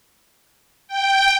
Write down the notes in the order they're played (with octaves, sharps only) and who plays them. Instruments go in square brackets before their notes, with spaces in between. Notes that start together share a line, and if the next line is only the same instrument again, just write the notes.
[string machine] G5